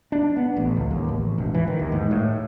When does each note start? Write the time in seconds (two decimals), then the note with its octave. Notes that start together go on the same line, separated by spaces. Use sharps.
0.12 D4
0.36 B3
0.56 A1
0.77 C#2
0.91 D#2
1.09 A1
1.38 E1
1.54 E3
1.68 D#3
1.79 D#2
1.92 G#2
2.11 A2